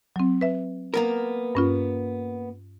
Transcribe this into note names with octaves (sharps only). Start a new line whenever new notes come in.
F#3 C4
B4 E5
A#3 B3 A#4
G2 C#4 F4